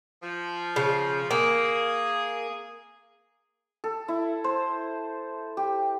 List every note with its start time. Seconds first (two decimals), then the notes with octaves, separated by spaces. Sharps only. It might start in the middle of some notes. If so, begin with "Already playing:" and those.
0.23 F3
0.76 C#3
1.31 A#3 G#4
3.84 A4
4.08 E4
4.44 C5
5.57 G4